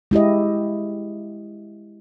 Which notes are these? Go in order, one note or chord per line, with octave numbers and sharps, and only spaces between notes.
G#3 E4 G4 D#5